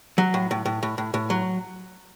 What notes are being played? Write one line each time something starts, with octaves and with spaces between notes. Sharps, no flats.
F#3
A2
A2
A2
A2
A2
A2
F#3